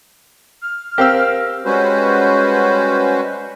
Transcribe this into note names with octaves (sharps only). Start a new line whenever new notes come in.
F6
C4 G4 A#4 F5 E6
G3 G#3 C#4 F#4 B4 C5